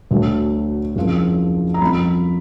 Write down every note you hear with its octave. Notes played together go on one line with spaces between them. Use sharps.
D2 D3 F#3
F#1 F2 F3
A#5
F2 F3 B5